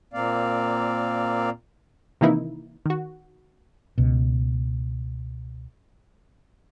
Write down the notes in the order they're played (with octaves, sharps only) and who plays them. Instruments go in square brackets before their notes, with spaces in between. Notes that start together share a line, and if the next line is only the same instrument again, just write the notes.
[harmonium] A#2 A#3 C4 D5 F5
[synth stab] C3 D#3 E3 A#3 D#4 E4
D#3 F#4
[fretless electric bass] C#2 B2